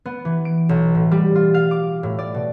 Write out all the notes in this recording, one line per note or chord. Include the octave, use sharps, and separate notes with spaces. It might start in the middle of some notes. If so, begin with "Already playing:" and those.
B3
E3
D7
B1
A2
G3
F4
F5
D6
A2
D5
B2